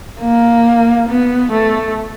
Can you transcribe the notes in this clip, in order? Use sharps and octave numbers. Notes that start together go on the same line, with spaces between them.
A#3
B3
A3